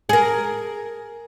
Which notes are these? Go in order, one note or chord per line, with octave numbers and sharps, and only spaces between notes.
G#4 A#4